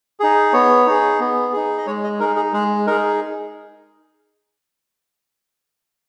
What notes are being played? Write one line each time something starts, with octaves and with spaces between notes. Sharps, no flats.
D#4 G#4
B3 C#5
D#4 G#4
B3
D#4 G#4
D#5
G#3 C#5
D#5
D#4 G#4 A#4
G#4
G#3 G#4
D#4 G#4 A#4